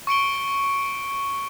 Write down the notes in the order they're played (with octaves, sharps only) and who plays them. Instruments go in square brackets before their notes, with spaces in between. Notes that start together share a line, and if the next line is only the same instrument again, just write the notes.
[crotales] C#6 C#7 D7 G7